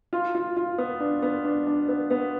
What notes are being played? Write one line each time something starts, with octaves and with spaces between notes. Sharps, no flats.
F4
F4
F4
B3
D4
B3
D4
D4
B3
B3